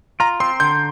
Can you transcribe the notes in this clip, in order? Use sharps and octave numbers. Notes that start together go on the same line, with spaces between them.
F4 A#5
C4 C6
D3 G6